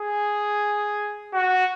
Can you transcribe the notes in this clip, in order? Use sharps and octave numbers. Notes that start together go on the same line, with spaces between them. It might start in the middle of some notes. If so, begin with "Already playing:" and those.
Already playing: G#4
F#4